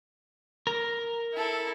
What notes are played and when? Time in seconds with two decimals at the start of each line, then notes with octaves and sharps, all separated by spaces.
0.67 A#4
1.33 E4 A4